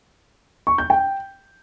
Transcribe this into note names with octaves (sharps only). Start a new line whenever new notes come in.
C#6
G6
G5